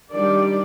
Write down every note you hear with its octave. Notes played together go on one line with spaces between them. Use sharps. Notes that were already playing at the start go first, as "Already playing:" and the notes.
D#3 G3 D4 G4 D5